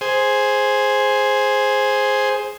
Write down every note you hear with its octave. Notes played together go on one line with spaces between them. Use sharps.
G#4 C5